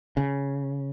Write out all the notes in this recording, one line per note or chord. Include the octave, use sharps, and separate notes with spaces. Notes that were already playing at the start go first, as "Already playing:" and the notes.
C#3